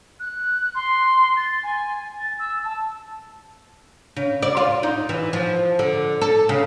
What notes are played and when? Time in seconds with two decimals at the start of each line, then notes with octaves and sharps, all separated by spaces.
0.20 F#6
0.75 C6
1.37 A6
1.63 G#5
2.19 A6
2.39 E6
2.64 A5
4.16 C#3
4.43 D5
4.57 F4
4.83 D#4
5.09 E3
5.33 F3
5.79 D3
6.22 A4
6.49 C#3